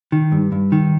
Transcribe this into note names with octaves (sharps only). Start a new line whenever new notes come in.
D#3
G2
G2
D#3